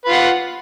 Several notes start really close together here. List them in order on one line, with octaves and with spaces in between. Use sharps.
B4 F4 F#5